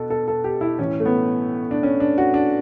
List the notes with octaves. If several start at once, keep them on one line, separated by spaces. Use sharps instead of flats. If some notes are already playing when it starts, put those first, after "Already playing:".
Already playing: B2 A4
A4
A4
G4
E4
A2 E3 C#4
A3
B3
D4
C#4
D4
F#4
D4